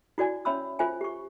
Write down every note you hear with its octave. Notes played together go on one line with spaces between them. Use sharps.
E4 F#4 D5 G#5
C#4 C#5 E5 B5 C6 E6
F4 C5 E5 G#5
G4 C#6